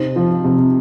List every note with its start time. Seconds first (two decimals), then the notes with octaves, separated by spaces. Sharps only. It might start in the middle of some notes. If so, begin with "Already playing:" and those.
Already playing: C3 C4 D#4
0.16 F3
0.44 C3